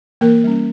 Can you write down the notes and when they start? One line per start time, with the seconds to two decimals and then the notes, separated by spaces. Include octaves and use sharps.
0.21 E3 A#3 A#4
0.44 G3 C#4